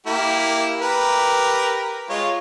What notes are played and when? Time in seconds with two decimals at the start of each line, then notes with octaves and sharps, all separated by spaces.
0.06 A#3 E4 G4
0.81 G4 A#4 B4
2.10 G#3 F4 C#5